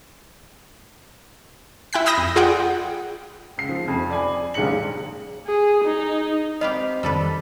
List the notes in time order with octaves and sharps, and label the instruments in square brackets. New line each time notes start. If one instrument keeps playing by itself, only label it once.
[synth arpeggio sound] E4 G5 F#6 B6
B5 D#6 E6 G6 A#6
F2
F4 G#4 D5 F#5 G5
[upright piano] C#2 C7
F3
F2 C3
D5 G#5 B5
D#1 A#1 G#2 C#3 C#7 F#7
[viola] G#4
D#4
[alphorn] C4 [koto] G4 B4 F5 [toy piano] D#5
[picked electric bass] F1 D#3 [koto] G3 A4 B4